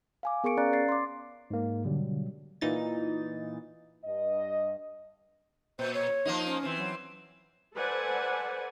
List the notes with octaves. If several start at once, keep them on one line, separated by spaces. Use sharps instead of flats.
F5 G#5 D6
B3 G#4 A#4 C#6 C#7 D7
C#4 D5 F5 A#5 F#6 A6
A6 C7
C6 D6
G#2 A#3
B2 D3 F#3 G3
A#2 E3 D#4 A6
G2 D#5
A#2 C5
C#5
F3 A#3 D#4
C#4
E3 C4
F#3
A4 B4 C5 D5 F#5 G#5